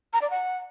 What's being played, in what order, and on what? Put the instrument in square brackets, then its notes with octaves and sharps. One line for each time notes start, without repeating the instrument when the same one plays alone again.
[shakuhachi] A#5
D5
F#5